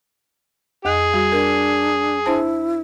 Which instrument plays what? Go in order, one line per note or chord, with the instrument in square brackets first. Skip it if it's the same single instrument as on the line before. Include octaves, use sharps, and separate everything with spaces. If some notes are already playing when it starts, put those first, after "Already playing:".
[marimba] F2 D#5 F#6 [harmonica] G#4
[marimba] G3 F#4
[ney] D4 [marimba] A#4
[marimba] D4 C5 A5 [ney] E4